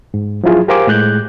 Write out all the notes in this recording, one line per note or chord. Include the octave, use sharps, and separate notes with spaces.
G#2
F3 F#3 E4 F4 G#4
G4 A#4 C5 F5 G#5 D6
A2 G#3 F#6 G6